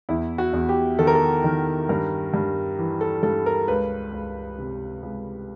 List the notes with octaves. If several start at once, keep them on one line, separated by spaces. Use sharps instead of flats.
E2 E4
F#4
E2
G4
D#3 A4
A#4
A4
D#3
G2 A#4
G2
E3
A4
G2 A4
A#4
C#2 B4
C#2
C3
C#2